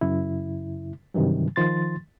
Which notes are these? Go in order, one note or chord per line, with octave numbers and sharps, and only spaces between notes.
F#2 C#3 E4
G2 C3 D#3 E3 F#3
D#3 F3 C6 A6